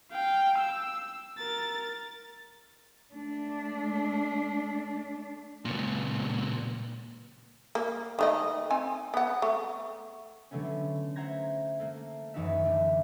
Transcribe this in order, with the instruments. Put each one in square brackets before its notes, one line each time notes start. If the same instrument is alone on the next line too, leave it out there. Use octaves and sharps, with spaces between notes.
[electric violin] F5 G5
E6
A#4 A6
[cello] A3 D4
[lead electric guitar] C#2 A#2
[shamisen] A#3
D#3 A3 D#5
C4 G#5
B3 F#5
A3
[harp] D3 F#3 A3 B3 C#4
C5 E5 F#5 A#5 G#6 A#6
A3 A#3
D#1 F#2 E3 D#4 F#4 E5
D3 A3 D4